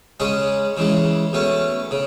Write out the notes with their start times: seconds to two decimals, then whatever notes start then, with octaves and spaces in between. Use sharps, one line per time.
0.20 C#3 G#3 C#4 G#4
0.77 C#3 E3 G#3
1.33 B2 A3 C#4
1.91 C#3